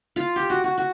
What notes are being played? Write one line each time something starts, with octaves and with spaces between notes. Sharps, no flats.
F4
G4
F#4
F#4
F#4